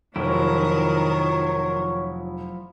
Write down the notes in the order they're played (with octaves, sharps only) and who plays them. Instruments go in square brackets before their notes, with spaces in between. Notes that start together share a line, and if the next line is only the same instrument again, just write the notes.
[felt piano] F1 [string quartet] D#3 A#4 [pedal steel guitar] F3 F#3 E4 [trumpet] C#5